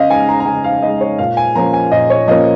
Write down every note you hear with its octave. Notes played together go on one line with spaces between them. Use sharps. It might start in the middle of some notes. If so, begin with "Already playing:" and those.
Already playing: C#3 D#5 F5
G#3 D#4 G#5
A#5
A#5
C#3 G#5
F5
G#3 D#4 D#5
C#5
A#2 F5
G#5
F3 A#3 C#4 A#5
G#5
A#2 D#5
C#5
F3 A#3 C#4 D#5